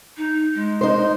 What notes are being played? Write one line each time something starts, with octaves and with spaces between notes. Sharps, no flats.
D#4
G#3
D#4 C5